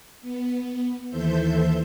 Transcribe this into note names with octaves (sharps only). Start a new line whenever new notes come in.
B3
D#2 E3 A4 C5 E5 G6